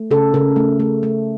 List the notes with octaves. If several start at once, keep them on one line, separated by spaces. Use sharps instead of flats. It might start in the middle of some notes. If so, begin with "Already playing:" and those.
Already playing: A3
C#3 A4
C#3 A#4
A3
A3
A3